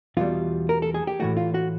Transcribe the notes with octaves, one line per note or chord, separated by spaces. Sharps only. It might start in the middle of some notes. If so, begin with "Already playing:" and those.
E2 B2 G3 F4
A#4
A4
G#4
G4
A2 E3 A3 F#4
F4
F#4